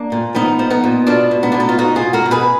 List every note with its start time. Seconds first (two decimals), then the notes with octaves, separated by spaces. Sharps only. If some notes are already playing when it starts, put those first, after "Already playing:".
Already playing: A#3 D4
0.12 A#2
0.35 F3 B3 D#4
0.59 F3
0.70 B3 D#4
0.84 A#2
1.07 B2 D4 F4
1.31 B2
1.43 B3 D#4
1.52 B2 D4
1.60 D#4
1.69 F4
1.78 B2 D#4 F#4
1.96 F4 G#4
2.01 B2
2.13 F#4 A#4
2.26 B2
2.31 G#4 B4